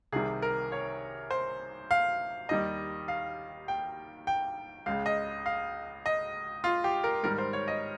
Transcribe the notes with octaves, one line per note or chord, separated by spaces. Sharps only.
C2 C3 D#3 G3 G#4
A#4
C#5
C5
F5
D#2 D#3 G3 D#5
F5
G5
G5
C#2 C#3 G#3 F5
D#5
F5
D#5
F4
G4
A#4
G#2 D#3 G3 A#4
C5
C#5
D#5